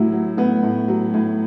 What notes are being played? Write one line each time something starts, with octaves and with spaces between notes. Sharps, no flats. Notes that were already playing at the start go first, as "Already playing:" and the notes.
Already playing: A2 F#3 E4 F#4
F#3
A2 B3
A2
F#3
A2